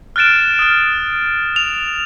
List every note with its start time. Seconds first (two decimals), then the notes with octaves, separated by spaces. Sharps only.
0.16 F6 F#6 A6 D7 E7
0.59 D#6 F6
1.56 F7